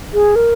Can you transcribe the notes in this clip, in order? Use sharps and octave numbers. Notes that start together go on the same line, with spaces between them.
G#4
A#4